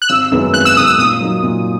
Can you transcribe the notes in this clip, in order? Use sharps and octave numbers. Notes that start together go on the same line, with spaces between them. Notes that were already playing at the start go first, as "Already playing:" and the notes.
F#6
G#1 E6
F#2 D#3 G#3 B3
G#1 F#6
E6
F#2 D#3 G#3 B3 D#6
E6
A#2 D#6
F#3 A#3 D#4
A#2